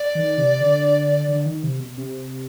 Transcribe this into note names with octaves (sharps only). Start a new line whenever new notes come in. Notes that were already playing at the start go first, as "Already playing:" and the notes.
Already playing: D5
D#3
C3
D3
D3
D#3
C3
B2
C3